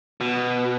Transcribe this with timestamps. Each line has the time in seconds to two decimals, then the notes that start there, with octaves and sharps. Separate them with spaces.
0.21 B2